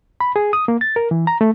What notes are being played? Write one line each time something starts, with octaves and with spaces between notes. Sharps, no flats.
B5
G#4
D#6
A#3
A6
A#4
E3
A#5
A3